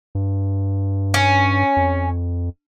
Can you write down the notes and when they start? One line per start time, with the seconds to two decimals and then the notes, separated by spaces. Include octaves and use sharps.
0.15 G2
1.14 C#4
1.77 F2